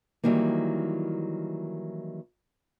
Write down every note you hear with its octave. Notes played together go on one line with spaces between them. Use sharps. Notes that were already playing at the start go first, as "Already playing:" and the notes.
D#3 E3 F#3 G3 A#3